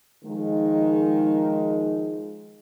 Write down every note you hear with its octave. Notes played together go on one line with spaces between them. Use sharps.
D#3 F3 G#3